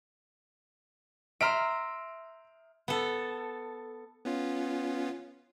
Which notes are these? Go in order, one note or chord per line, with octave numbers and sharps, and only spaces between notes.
E5 A#5 C6 F6 D7
B3 A4
B3 C#4 F4